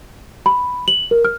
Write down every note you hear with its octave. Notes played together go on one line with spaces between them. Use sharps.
B5
F#7
A#4
F6